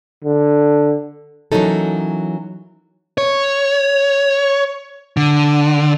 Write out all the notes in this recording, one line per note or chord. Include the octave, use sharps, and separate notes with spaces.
D3
E3 F#3 A#3 C#4 D#4 A4
C#5
D3